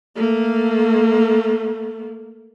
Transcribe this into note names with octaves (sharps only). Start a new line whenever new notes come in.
A3 A#3